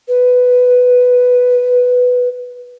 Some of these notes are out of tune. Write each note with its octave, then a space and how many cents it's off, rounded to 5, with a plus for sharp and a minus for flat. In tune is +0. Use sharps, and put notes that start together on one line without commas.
B4 +5